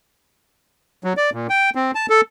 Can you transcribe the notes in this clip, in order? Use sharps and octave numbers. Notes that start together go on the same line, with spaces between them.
F#3
D5
A#2
G5
C4
A5
A4